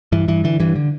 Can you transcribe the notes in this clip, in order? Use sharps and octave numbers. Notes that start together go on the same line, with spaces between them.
G2 E3
G2 E3
D3 E3
G2 E3
D3